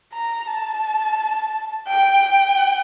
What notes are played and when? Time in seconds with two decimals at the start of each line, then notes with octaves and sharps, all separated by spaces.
0.13 A#5
0.47 A5
1.88 G5
2.23 G5